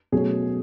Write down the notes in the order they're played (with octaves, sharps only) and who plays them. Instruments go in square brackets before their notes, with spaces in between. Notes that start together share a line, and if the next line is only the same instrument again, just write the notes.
[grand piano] B2 F#3 A3 C#4 G#4